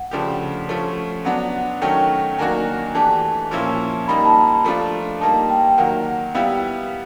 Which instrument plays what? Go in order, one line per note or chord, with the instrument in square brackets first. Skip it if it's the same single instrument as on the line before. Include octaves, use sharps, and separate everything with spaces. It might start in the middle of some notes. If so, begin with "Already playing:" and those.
Already playing: [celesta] F#5
[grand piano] C#3 F3 A3 D4 G4
F3 A3 C#4
[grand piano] F#3 B3 D4 [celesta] F#5
[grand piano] D#3 F#3 A3 C#4 [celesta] G5
[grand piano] D#3 F#3 A#3 D4 F#4 [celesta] G#5
[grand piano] E3 A3 D4 G4 [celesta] A5
[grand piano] A#2 F3 A#3 C#4 E4
[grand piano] G3 A#3 D#4 [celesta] B5
[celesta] A5
A#5
[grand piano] F3 A3 D4 F4
[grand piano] G3 A#3 D#4 [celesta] A5
[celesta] G5
[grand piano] D#3 F#3 A#3 [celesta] F#5
[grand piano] G3 B3 E4 G4 [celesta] F5